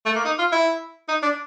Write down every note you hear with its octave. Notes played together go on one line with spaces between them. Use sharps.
A3
A#3
D#4
F4
E4
D#4
D4